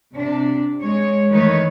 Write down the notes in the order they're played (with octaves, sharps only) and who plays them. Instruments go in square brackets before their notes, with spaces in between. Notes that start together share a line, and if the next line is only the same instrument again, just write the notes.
[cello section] C3 D4
G#3 C#5
D#3 E3 A3 D#4 B4 C#5